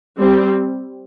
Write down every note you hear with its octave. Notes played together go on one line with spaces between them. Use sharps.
G3 C4